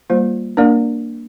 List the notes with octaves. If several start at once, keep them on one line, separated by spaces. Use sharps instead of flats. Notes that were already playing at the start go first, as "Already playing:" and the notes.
G3 A#3 F4 C5
A#3 D4 A#4 D5